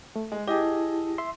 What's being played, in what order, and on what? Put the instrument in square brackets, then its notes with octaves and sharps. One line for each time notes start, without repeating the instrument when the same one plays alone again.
[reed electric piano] A3
[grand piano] G#3
[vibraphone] E4 A5 [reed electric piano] G4 [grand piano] G#4 D#5
[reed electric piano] E5 C6